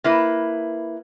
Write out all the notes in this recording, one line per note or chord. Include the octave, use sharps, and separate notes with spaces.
A#3 E4 B4